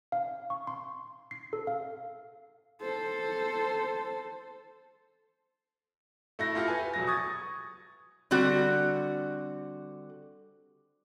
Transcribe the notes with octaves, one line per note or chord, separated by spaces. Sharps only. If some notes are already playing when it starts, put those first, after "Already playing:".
F5
C#6
C6
C7
A4
F5
A4 C5
A3 E4 A#6
E4 F4 G4 A4
B4 G#5
E1 F#3 A#6
C#6 D#6 G#6 A6
D3 G3 C4 F#4